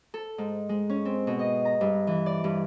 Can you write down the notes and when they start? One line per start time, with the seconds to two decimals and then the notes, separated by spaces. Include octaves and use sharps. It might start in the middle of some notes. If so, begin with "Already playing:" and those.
0.14 A4
0.38 G#2
0.69 G#3
0.89 C#4
1.05 C4
1.27 B2
1.39 D#5
1.65 A#5
1.81 G2
2.07 E3
2.26 D5
2.44 G2